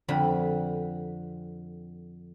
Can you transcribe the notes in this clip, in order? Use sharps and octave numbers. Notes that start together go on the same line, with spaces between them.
F2 D3 B5